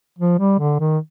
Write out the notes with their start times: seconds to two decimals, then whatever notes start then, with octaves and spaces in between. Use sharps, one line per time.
0.18 F3
0.38 G3
0.59 D3
0.80 D#3